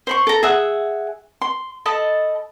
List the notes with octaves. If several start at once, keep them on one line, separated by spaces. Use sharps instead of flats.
C5 B5 C#6
A4 A#5
G#4 E5 F#5
C6
A4 D#5 A5 B5